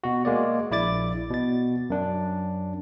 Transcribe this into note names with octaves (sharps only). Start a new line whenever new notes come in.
B2 F#4
G#3 A#3 D5
A#1 E4 D5 D6 A6
B2 A6
F#2 D4